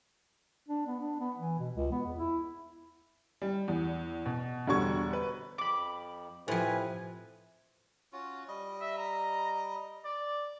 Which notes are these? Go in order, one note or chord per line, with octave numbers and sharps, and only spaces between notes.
D4
B3
D4
B3
E3
B2
C#2
B3
E2
E4
G3
E2
B2
E1 D3 G3 F#4 C#6 G#6
B4
F2 B5 D6
A2 C3 F3 B4 G#5
C#4 F4 F#4
G3 D#5
E5
A#5
D5